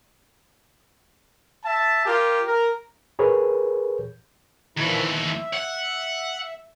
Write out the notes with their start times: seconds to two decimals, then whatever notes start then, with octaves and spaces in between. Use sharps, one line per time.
1.65 E5 A5
2.06 F4 G4 A#4
2.46 A#4
3.19 G4 G#4 A#4 B4 C#5
4.77 D#2 A#2 E3 F3 E4
5.10 E5
5.54 F#5